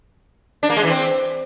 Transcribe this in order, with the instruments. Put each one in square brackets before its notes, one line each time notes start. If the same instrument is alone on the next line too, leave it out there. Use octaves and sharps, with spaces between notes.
[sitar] D4
A#3
G#3
E3
C4